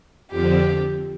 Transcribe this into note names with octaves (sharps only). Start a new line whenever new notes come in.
F2 D3 F3 C4 G4